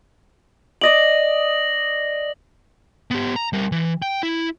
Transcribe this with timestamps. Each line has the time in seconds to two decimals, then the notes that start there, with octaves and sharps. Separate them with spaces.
0.81 D5 D#5 D6 A#6 F#7
3.11 B3 G4
3.36 A#5
3.53 G3 A#4
3.72 E3
4.02 G5
4.23 E4